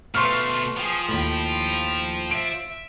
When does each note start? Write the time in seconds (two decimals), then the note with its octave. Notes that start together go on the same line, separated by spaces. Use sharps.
0.15 B2 A3 B4 F5 C6 C#6 F6
0.77 F3 G#4 G5
1.09 D#2 A2 G5 B5
2.31 E5 D7